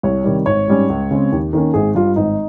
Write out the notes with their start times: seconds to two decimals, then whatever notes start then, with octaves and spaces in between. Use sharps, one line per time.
0.03 C2 C#5
0.24 C3 D#3 G3
0.46 G#1 C#5
0.68 G#2 G3 C#4
0.89 C#2
1.11 C#3 G#3 C4
1.32 D#2
1.53 D#3 A#3 C#4
1.74 G#1 G#4
1.95 G2 G3 F4
2.16 G#1 D#4